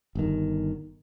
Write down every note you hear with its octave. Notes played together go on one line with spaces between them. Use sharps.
G1 D#3